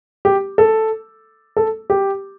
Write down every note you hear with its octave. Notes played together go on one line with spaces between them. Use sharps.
G4
A4
A4
G4